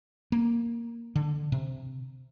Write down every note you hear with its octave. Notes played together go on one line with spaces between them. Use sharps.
A#3
D3
C3